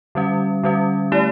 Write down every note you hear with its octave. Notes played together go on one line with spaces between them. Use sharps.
D3 G3 C#4
D3 G3 C#4
A3 E4 G4 D5